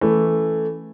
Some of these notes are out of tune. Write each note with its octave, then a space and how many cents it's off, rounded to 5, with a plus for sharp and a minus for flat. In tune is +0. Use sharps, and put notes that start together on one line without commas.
E3 +0 A3 +0 C#4 +0